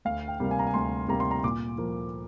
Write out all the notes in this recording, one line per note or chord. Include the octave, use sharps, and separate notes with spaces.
D2 F5
G5
C3 G3 A#3
G#5
A#5
G#5
D2 C6
C3 G3 A#3 A#5
C6
A#5
A#2 D6
F3 A#3